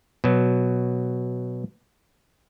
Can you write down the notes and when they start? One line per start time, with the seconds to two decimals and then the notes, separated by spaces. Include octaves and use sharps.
0.24 B2 F#3